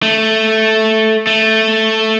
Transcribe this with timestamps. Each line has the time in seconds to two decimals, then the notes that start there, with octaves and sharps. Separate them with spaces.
0.03 A3
1.27 A3